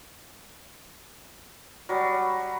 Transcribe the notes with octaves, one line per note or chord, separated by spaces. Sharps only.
F#3 G3